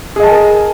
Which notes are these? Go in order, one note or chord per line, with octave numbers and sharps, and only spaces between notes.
G#4 A#4 D#5 G#5 A5